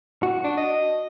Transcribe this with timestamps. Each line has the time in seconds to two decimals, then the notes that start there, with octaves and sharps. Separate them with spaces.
0.23 F#4
0.44 D4
0.58 D#5